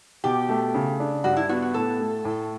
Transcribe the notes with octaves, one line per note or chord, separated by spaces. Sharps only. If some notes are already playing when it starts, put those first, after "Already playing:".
B2 G4
A3
C#3
D4
G2 F#4
E4
B3 F#4
F#4
A2 A4
A3
A2